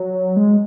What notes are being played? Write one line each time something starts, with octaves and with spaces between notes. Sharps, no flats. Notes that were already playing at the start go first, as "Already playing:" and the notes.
Already playing: F#3
G#3